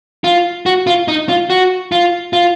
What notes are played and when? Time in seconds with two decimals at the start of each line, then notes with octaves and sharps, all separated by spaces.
0.24 F4
0.66 F#4
0.87 F4
1.08 D#4
1.29 F4
1.50 F#4
1.92 F4
2.33 F4